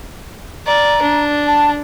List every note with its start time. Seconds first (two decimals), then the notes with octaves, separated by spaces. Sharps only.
0.67 D5 A#5
1.02 D4
1.47 A5